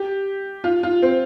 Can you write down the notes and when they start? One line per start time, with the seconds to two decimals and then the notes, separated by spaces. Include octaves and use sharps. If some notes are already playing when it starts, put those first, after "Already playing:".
Already playing: G4
0.64 F4
0.83 F4
1.02 C4